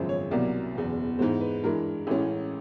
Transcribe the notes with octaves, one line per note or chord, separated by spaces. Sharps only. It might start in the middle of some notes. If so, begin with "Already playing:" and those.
Already playing: G#1 F#2 C#3 F3 G#3 C5
C#5
C2 B2 F#3 A#3 D5
F#1 E2 B2
G#2 E3 G#3 B3 C5
B4
G2 E3 G#3 A#4
A1 A2 E3 G#3 C#4